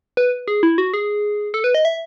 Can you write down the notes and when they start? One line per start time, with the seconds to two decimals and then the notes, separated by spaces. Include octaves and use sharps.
0.17 B4
0.48 G#4
0.63 E4
0.78 F#4
0.94 G#4
1.54 A4
1.64 B4
1.75 D#5
1.85 E5